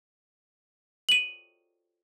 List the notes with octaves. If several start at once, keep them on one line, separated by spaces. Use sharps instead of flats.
D#7 F#7